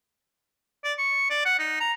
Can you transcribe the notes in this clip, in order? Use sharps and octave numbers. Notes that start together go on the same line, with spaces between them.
D5
C#6
D5
F#5
D#4
A#5